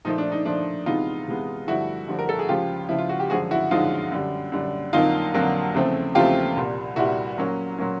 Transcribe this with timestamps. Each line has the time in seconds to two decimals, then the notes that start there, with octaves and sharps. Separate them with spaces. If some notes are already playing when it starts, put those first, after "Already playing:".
0.05 A#2 F3 A3 D#4
0.18 D4
0.32 D#4
0.45 A#2 F3 A3 D4
0.86 C3 E3 G#3 B3 D#4 F4
1.27 C3 E3 G#3 B3
1.67 G2 D3 F3 A3 E4 F#4
2.08 G2 D3 F3 A3
2.19 A#4
2.29 A4
2.39 G#4
2.49 C#2 C#3 F3 F4 G4
2.89 C#2 C#3 F3 E4
2.98 F4
3.09 F#4
3.20 G4
3.30 F#2 D3 F3 G#3 F#4 G#4
3.51 E4 F#4
3.71 F#2 D3 F3 G#3 D#4 F4
4.12 F#2 D3 G3
4.52 F#2 D3 G3
4.93 F2 D3 F#3 A#3 D#4 F4
5.34 F2 D3 F#3 A#3
5.74 E2 C#3 F3 A3 C4
6.15 E2 C#3 F3 A3 C4 F4 G4
6.56 C2 A#2 G3
6.96 C2 A#2 G3 E4 F#4
7.37 A#2 F#3 A#3 C#4
7.78 A#2 F#3 A#3 C#4